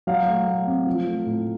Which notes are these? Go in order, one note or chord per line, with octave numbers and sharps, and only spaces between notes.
F#3 F5
A3
A3
C4
F3
A3
A2